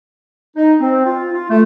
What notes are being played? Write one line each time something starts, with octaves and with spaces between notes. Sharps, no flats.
D#4
C4
F4
F4
A3